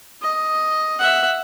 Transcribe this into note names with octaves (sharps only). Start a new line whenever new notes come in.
D#5
E5 F#5